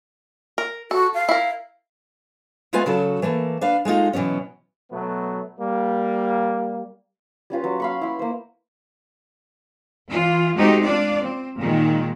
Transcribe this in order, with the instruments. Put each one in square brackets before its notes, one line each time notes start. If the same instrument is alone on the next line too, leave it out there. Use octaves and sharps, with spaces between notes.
[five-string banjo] A#4
[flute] F#4 [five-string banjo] A4
[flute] F5
[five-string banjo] E4 A#4
[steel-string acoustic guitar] G#3 A3 B3 F4 B4 G#5
C#3 F#3 F#4 A4
E3 A3 A#3 A5
D4 B4 F5
G#3 A3 D#4 F4
B2 E3 F#3 B3 C#4
[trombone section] B2 F#3 A3 B3
G3 A#3
[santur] G3 C#4 F4 B4
F#3
F5 B5 C#6
E4 C6
A#3 C5
[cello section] E3 F4
G#3 A3 C4 D#4 F#4 G4
D4 F4 D5
C4
A#2 D#3 G#3